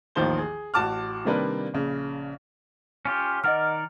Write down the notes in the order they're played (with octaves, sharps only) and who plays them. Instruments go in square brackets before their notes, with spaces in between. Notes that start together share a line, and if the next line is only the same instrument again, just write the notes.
[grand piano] A1 D#2 D#3 F3 C5 G7
G#4
A1 F#4 A5 D6 F6
C3 D#3 G3 A#3 D4 B4
A#1 C#3
[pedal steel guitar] C#4 F4 G4
[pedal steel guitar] D#3 A#4 D5 [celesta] D#5 F#5 F6